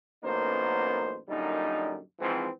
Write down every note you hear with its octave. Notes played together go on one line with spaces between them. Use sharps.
A1 F#2 A#3 B3 D#4 C5
F#2 A#2 D3 G3 D#4
G#2 E3 F3 C4